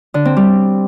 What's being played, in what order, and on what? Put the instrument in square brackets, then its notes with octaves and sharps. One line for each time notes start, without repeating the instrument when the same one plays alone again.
[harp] D3
C4
G3